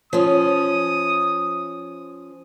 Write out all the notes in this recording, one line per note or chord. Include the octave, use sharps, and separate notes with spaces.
F3 C#4 D#6